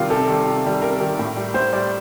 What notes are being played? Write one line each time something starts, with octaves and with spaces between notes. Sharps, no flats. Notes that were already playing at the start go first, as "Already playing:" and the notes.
Already playing: C3 D#3 G3 F4 A#4
C3 A4
D#3 G3
C3
D#3 G3
C3 A#4
D#3 G3
A2
G3
A2 C5
G3 D5